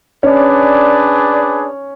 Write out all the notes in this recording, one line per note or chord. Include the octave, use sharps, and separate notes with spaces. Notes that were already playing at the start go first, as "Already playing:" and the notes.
C#4 D4 G#4 B4 C#5 D5